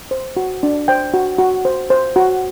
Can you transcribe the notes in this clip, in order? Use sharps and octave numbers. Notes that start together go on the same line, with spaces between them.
C5
F#4
D4
C5 G5
F#4
F#4
C5
C5
F#4